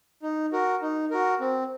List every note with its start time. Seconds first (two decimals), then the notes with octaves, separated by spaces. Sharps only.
0.23 D#4
0.52 F#4 A#4
0.82 D#4
1.11 F#4 A#4
1.40 C4